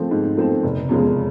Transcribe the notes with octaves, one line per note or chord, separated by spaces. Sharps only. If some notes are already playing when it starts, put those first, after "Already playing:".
Already playing: F3 A3 C4
G#2
F3 A3 C4
F1
E2 C#3 F3 G#3